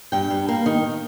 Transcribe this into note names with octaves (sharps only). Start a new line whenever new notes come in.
G2 G5
G2
A#3
D#3